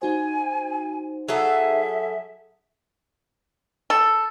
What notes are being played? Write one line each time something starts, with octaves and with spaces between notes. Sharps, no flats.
D#4 F#4 C5 G#5
F#3 G#4 A4 E5
A4